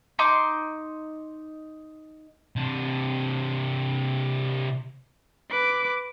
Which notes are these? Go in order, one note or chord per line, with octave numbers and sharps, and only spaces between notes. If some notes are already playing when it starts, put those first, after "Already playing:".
D#4 C6 D6
C3 D4
B4 D6